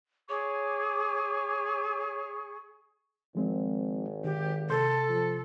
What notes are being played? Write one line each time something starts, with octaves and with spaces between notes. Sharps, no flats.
G#4 C#5 C#6 D6
G#1 F3 G#3 C4
D#3 G4
C3 A4 C6 G6
F3